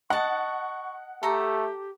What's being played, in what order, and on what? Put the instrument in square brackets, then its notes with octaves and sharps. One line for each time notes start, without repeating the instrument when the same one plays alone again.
[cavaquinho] D#5 A5 [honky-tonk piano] F#5 [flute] C#6
[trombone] A3 [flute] G4 [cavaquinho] A4 A#5